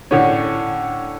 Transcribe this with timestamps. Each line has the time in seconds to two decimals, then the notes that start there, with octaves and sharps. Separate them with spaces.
0.11 A2 D3 C#4